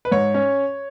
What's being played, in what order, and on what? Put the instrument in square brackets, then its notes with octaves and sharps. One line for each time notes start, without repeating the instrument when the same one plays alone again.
[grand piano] B4
G#2 C#5
C#4